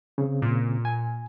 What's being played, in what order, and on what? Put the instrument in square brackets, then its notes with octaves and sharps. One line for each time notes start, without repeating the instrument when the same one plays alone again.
[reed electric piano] C#3 C4
[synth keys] A#2
[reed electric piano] G#5